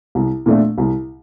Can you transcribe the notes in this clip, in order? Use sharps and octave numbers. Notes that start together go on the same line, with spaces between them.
C2
A#2 F3 A3 D4
C2